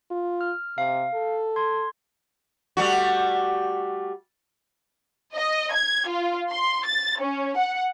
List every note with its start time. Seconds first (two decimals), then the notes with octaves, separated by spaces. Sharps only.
0.11 F4
0.41 F6
0.78 C3 F5
1.14 A4
1.56 C6 G#6
2.77 G3 A3 F#4
5.34 D#5
5.74 G#6
6.08 F4
6.51 C6
6.86 A6
7.21 C#4
7.58 F#5